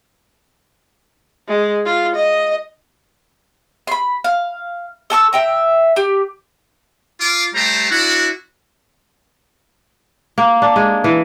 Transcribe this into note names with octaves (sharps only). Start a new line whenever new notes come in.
G#3
F4
D#5
B5 C6
F5
A4 A5 C#6 E6
E5 G5 A#5
G4
F4 D6
G3 A3 G4 C5 A#5
D4 E4 F#4
A#3
D4
G#3
E3